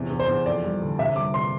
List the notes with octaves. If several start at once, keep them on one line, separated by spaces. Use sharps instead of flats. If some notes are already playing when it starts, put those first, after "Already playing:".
Already playing: E2 C3
E2
C5
E2
F2 D5
G3
D3
C3 E5
G3 D6
C3 C6